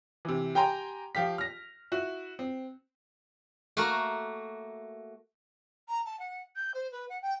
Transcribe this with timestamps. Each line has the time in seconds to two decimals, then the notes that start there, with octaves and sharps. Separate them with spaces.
0.25 C3 E3
0.55 G4 G5 G#5 A#5 C6
1.15 F3 G4 F5 B6
1.38 F6 A#6
1.92 E4 F#4
2.39 C4
3.77 A3 A#3 F#4 A#4
5.88 A#5
6.06 A5
6.19 F#5
6.56 G6
6.74 C5
6.92 B4
7.09 F#5
7.22 G5